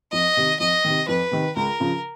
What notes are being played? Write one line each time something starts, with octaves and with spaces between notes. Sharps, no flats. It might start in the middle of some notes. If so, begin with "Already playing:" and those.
F2 D#5
C3 D#3
F2 D#5
C3 D#3
F2 B4
C3 D#3
C#2 A#4
C#3 F3